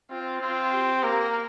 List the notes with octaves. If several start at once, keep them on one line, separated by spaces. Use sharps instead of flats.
C4 F4
C4 F4
G4
A#3 A#4